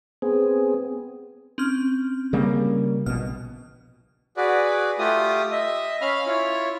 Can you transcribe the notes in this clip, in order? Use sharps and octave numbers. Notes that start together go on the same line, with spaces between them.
B3 C4 G#4
C4 C#4 F6
C#3 G3 A#3
A#1 B2 F6
F#4 G#4 B4 D5
A3 F4 G4 D#6
D#5 E5
C#4 F5 B5 F6
E4 F4 C#5